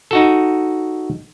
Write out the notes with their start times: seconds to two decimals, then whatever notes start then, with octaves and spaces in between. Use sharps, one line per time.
0.11 D#4 F#4 A4